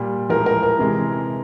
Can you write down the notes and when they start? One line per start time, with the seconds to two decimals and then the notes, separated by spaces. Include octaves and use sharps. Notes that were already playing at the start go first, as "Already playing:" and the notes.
Already playing: A#2 G3
0.29 A2 F3 G#3 A#4
0.46 A#4
0.63 A#4
0.79 C3 E3 G#3